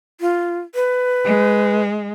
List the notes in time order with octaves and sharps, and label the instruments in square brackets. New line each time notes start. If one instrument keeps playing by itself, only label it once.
[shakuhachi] F4
B4
[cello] G#3